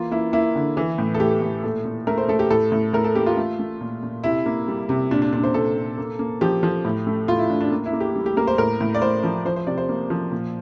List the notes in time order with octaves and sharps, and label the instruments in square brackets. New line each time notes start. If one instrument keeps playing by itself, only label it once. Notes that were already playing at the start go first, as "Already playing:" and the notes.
Already playing: [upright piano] E3 A#3 F4
A#3 E4
A#3 E4
D3
E3
A2
A4
A2 G4
A2
A#2 A4
A#2
A3 A#4
C5
A3 A4
G4
A2 A4
A2
A2 A#4
A4
A#3 G4
F4
A3
A3
A#2
A#2
C3 E4
A#3
G3
C3
A#2 D4
D4
A#2 D4
C5
A#2 A4
A#2
A#3
A#3
F3 G4
F3
A2
A3
A2 F4
E4
A2 D4
D4
A#3
E4
A#3
G4
G3
G4
A#3 A#4
C5
A2 A#4
A2
D5
A2 C5
F3
F3 C5
C5
C3 D5
C5
A#3
F3
A#2